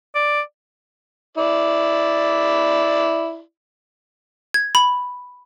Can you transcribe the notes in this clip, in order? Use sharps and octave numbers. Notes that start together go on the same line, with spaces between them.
D5
E4 D5
G#6
B5